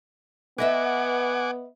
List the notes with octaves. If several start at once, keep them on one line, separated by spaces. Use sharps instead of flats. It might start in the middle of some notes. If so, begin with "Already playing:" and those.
B3 B4 D#5 E5 F#5 G#5 D6